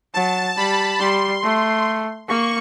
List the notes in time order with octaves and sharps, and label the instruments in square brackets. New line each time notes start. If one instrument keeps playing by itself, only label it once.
[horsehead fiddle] F#3 [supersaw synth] A5
[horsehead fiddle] G3 [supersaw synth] B5
[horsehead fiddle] G3 [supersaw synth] C6
[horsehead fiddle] A3
[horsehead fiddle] A#3 [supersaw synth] C#6